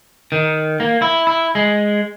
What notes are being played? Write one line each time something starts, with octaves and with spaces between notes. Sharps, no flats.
D#3
A#3
E4
E4
G#3